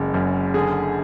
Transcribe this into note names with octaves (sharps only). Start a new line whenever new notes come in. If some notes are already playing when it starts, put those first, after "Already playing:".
Already playing: F#1 C#3 G#3
F#2
D3 G#4